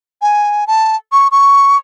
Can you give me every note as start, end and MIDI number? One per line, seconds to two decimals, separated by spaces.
0.22 0.67 80
0.67 0.96 81
1.12 1.28 85
1.32 1.77 85